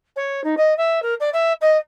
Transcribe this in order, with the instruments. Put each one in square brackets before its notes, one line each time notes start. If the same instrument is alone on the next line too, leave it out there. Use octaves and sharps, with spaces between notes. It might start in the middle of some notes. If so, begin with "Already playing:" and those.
[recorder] C#5
D#4
D#5
E5
A#4
D5
E5
D#5